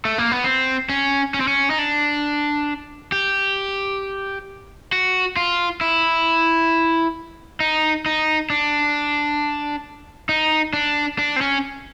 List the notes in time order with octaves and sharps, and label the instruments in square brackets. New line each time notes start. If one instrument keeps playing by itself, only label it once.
[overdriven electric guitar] A3
A#3
B3
C4
C#4
C#4
C4
C#4
D#4
D4
G4
F#4
F4
E4
D#4
D#4
D4
D#4
D4
D4
C4
C#4